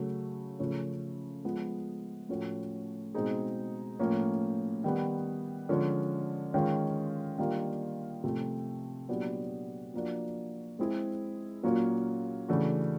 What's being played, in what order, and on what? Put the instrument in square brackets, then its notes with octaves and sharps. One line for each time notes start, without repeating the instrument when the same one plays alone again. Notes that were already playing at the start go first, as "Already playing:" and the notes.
Already playing: [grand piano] C#3 F#3 A3
C#3 F3 A3 C#4
F3 G#3 B3
A2 F3 A3 C#4 F#4
B2 G#3 C4 D#4 G#4
A2 F3 A#3 C#4
D#3 G3 B3
D3 F3 G#3 C#4
D#3 G#3 C#4 F4
D#3 G3 A#3 D4 F4
C3 F3 A3
A#2 F#3 B3 D4 G4
F3 A#3 D4 F#4
G#3 C4 E4 G#4
A#2 F#3 A#3 C#4 F4
C#3 E3 A3 D4 F#4